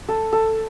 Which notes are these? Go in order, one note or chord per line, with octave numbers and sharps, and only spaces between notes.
A4
A4